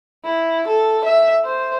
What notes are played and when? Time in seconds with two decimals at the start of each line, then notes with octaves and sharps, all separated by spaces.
0.25 E4
0.67 A4
1.05 E5
1.45 C5